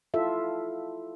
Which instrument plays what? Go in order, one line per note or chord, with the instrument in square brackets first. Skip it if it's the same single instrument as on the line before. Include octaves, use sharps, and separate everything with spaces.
[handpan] E4 F4 A4 E5